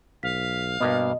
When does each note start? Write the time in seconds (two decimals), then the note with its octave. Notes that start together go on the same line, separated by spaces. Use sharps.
0.23 B1 F5 B6
0.80 G2 B2 A#3 B3 D#5